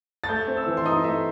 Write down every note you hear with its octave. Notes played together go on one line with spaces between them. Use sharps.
A6
A3 G6
C4
E6
E3
C6
D#4 D#6
A3 E5